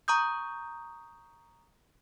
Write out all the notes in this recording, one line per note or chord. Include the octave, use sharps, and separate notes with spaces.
A#5 C#6 D#6 G6